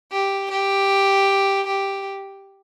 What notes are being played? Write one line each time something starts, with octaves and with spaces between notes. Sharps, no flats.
G4
G4
G4